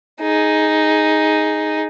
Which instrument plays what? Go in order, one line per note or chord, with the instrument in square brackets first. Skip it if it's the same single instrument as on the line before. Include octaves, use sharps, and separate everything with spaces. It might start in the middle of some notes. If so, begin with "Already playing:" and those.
[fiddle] D#4 G#4